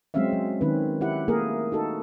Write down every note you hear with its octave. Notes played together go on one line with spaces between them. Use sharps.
F#3 G#3 C4 C#4 E5 F5
F#3
D#3 C4 C#4 B4
E4 G4 F#5
A3 A#3 G#4 A#4
D#4 F#4 A4